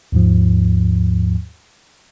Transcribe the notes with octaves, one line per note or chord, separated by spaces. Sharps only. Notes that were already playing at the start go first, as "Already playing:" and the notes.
D#2 G#2 F3